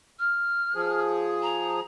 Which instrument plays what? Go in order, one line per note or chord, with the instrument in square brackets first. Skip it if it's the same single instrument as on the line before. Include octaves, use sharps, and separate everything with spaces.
[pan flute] F6
[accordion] F3 G#4
[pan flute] A#5